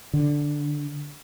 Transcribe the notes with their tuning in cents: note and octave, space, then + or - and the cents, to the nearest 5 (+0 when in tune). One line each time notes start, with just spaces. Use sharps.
D3 +0